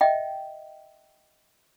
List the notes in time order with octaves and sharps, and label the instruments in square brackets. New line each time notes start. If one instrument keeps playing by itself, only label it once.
[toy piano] D#5 E5 G5